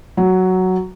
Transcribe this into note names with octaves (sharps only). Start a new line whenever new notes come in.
F#3